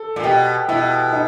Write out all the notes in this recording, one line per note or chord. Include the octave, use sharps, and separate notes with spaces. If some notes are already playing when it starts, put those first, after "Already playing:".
Already playing: A4
A#2
B2 G4
B2 E4
D#4